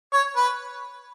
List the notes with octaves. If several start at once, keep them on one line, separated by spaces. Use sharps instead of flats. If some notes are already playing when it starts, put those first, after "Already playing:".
C#5
B4